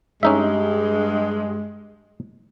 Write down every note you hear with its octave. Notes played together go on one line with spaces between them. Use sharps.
G2 G#3 C#4 D#4 E5